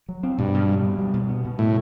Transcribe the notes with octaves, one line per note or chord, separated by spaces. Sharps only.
F#3
C4
G2 B2
B2
G3
B2
G3
B2
B3
B2
A2